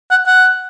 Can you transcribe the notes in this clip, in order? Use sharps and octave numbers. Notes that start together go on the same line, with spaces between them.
F#5
F#5